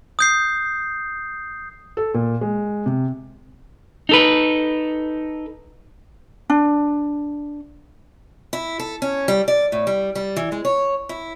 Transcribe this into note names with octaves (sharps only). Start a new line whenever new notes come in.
D#6 G6 C7
A4
A#2
G#3
C3
D#4 A4 B4
D4
E4
A4
C#4
G3
D5
A2
G3
G3
E3
G#3
C#5
E4